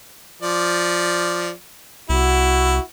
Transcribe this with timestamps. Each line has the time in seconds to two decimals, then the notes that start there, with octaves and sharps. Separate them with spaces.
0.42 F3 D5
2.09 C2 E4 F#4